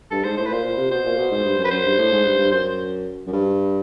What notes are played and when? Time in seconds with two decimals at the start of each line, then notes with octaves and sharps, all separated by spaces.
0.11 G2 A4
0.24 G#2 C5
0.37 A2 C5
0.46 B4
0.51 A#2 C5
0.64 A#2
0.77 C3
0.91 B2 C5
1.05 A#2
1.18 B2
1.31 G#2
1.45 G2
1.58 F#2
1.65 B4
1.71 F#2 C5
1.84 G2
1.98 A2
2.12 G#2
2.25 G2
2.39 G2
2.51 F#2 C5
3.27 F#2
3.33 G2